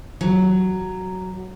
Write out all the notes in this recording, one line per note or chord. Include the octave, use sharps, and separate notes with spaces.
F#3